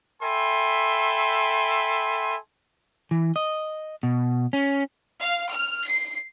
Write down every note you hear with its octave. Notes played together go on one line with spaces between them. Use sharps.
A4 E5 G5 G#5 B5 C6
E3
D#5
B2
C#4
F5
F6
C7